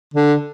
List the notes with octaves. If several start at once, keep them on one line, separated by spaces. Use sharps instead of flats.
D3